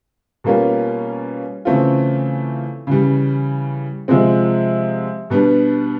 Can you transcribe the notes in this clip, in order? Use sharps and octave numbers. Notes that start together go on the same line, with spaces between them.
B2 G3 A#3 C#4 F4
C#3 E3 A3 C4 F4
C#3 E3 G3
C3 F3 G#3 C4
B2 G3 B3 D4